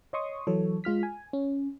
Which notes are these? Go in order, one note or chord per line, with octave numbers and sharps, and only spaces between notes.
C#5 D#5 C6 C#6 D#6
E3 F#3 A4 C#5
G#3 F4 F6 B6
G#5
C#4